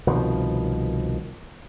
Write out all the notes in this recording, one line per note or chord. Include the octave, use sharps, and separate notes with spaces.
C2 B2 D#3 F3